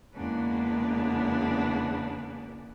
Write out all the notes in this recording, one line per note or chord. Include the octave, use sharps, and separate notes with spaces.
E2 C#3 G#3 A#3 B3 D4